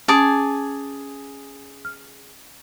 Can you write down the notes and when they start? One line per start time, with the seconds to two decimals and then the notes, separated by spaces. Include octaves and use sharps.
0.08 C#4 G#4 A5 D6
1.85 F6